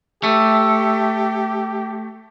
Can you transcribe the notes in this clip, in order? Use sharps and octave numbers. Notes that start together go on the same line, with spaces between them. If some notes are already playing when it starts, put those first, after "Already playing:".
A3 G4